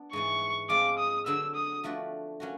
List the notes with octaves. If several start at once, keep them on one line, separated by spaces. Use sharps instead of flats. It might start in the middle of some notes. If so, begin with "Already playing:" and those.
Already playing: B3 D4
G#2 E3 G#3 C#6
F3 G#3 C4 F4 D6
D#6
D3 F#3 B3 E6
D#6
F3 A3 D4 F#4 B4
F#3 A#3 C#4 F#4